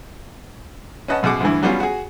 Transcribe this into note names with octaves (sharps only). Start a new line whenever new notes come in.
C#4 B4 D#5 F#5 A5
F#2 B2 G#4 F#5 D6
D2 G2 E3
F#3 G3 B3 C#4 F4
F#4 G#4